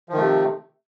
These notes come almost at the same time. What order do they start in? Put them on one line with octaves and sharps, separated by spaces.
F3 D#3 A3 C3